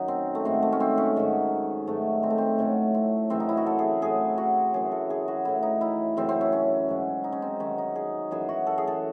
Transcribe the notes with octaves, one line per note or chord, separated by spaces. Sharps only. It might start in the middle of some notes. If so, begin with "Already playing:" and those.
Already playing: F#2 D#3 F#3 D#4
C4
A3
G#2 D#3 F#3 C4
A3
C#4
C4
C#4
G#2 D#3 F#3
G#2 D#3 F#3 A3
C4
A3
C4
A2 F#3 C#4
C4
F#2 C#3 E3 C4
D#4
E4
F#4
A4
G#4
A2 F#3 G#4
F#4
F#2 E3 G#4
A4
G#4
F#4
A2 E3 E4
D#4
E4
F#2 C#3 E3 C4
C4
C#4
C#4
G#2 F#3
D#4
C#4
C4
C3 D#3 F#3 C#4
D#4
G#4
F#2 E3 G#4
F#4
A4
G#4
A4